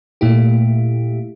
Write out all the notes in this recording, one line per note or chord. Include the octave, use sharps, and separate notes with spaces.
A#2 A3 E4 G4